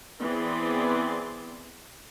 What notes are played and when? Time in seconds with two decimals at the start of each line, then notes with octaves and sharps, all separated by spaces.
0.21 E3 B3 C4 G#4 D5 C6